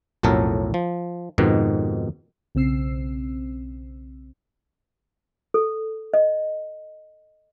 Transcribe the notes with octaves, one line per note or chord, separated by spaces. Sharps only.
B1 F2 A2 F#3 A4 A#4
F3
F2 G#2 B2 D#3
B1 C#3 C4 E6 C7
A4
D#5